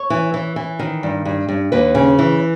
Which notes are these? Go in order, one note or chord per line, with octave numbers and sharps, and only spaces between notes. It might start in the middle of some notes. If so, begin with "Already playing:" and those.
Already playing: C#5
E3
E3
E3
D#3
G2
G2
G2
D#2 B4
C#3
E3